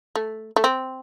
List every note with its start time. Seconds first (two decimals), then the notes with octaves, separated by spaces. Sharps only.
0.16 A3
0.56 A3
0.64 C4